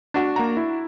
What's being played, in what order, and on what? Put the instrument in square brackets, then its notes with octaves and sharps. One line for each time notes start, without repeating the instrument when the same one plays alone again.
[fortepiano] D4 F#4
[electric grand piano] A#3 F#5 A#5
E4